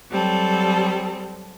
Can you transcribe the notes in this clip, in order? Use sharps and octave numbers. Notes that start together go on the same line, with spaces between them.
F#3 G3 C4 A4